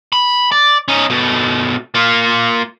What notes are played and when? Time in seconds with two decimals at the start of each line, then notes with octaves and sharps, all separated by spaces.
0.13 B5
0.52 D5
0.88 C#4 D#4
1.10 B2 A3
1.95 A#3 F4